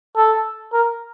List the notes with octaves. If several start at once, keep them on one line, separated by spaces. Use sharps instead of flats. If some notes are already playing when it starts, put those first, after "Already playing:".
A4
A#4